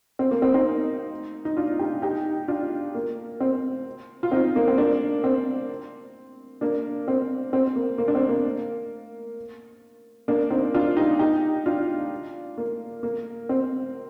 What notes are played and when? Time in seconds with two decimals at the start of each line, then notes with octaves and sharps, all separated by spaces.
0.19 C4
0.31 A#3
0.42 C4
0.54 C4 D#4
1.45 D#4
1.57 D4 F4
1.79 D#4 G4
2.02 D#4 G4
2.48 D4 F4
2.95 A#3
3.40 C4
4.23 F4
4.31 C4 D#4
4.56 A#3
4.68 C4
4.78 A#3 D4
5.24 C4
6.61 A#3 D4
7.08 C4
7.53 C4
7.76 A#3
7.98 A#3
8.08 D4
8.15 C4
8.29 A#3
10.28 A#3 D4
10.50 C4 D#4
10.74 D4 F4
10.97 D#4 G4
11.19 D#4 G4
11.66 D4 F4
12.58 A#3
13.03 A#3
13.49 C4